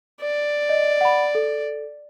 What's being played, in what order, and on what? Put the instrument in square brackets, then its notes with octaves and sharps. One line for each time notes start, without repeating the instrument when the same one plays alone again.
[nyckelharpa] D5
[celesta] D#5
F#5 B5
A4